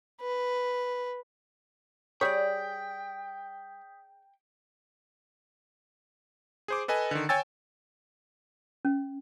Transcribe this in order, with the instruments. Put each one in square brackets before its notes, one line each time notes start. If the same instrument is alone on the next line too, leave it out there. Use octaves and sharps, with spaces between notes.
[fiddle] B4
[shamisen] G3 C#5 [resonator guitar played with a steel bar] G#4 D5 [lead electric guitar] G5 [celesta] D#6 G6 B6
[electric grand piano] G#4 C5 D6
A4 B4 D#5 G#5
D3 D#3
C#5 G5 G#5 E6 A6
[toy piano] C#4